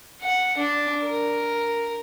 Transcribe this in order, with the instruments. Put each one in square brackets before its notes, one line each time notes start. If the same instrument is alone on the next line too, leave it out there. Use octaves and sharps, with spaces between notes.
[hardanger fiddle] F#5
D4
A#4